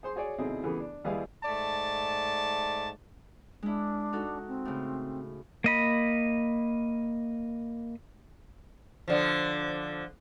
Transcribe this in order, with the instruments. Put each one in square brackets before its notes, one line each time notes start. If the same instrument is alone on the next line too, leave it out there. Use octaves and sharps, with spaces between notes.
[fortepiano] G#4 C5 C6
F#4 G#4 C#5 D5 G#5
B2 D3 C4 D#4 E4 G#4
C#3 E3 A3 B3 G4 G#4
D4
D#2 G3 E4 G#4 B4 F5
[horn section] G#2 A3 D5 A5
[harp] G#3 E4 [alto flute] D4
[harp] D#4 F#4 A4
[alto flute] C4
[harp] A2 C#3
[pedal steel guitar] A#3 D#5 B5
[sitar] D3 F3